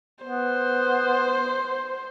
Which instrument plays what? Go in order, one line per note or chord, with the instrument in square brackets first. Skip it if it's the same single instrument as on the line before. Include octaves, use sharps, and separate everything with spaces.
[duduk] B3 [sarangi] C5